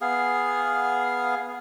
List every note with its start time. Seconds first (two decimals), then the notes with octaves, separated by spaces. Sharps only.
0.01 B3 G#4 F5